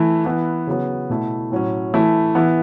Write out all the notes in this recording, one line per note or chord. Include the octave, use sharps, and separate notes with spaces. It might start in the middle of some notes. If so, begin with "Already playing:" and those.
Already playing: E3 A3 E4
E3 B3 E4
C#3 F#3 B3
B2 A3 E4
A2 F#3 C#4
E3 A3 E4
E3 B3 E4